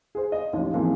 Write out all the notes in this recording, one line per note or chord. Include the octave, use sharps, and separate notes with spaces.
G#4 C5
D#5
A1 D#2 F3
F2 G#2 E3 F3 A#3